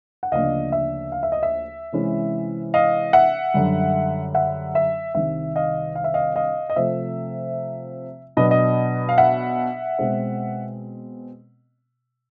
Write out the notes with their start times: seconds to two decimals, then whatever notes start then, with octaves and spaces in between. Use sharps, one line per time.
0.23 F#5
0.32 D2 C#3 F3 A#3 D4 D#5 F5
0.72 E5
1.12 F5
1.23 E5
1.32 D#5
1.43 E5
1.92 C3 E3 G#3 C#4
2.74 D#5 F5
3.13 E5 F#5
3.54 F#2 D3 G3
4.35 E5 F#5
4.75 E5
5.15 C2 C3 D#3 G3 E5
5.56 D#5 F5
5.95 F5
6.04 E5
6.14 D#5 F5
6.36 D#5 F5
6.70 D#5
6.76 C3 F3 A3 C4 E5
8.37 B2 F#3 B3 D4 D#5
8.51 D#5
9.09 F5
9.18 E5 F#5
9.98 B2 G#3 C4